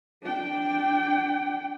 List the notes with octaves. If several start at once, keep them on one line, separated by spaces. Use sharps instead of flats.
D4 G5